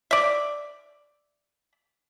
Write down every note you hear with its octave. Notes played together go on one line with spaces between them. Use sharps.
D5 E5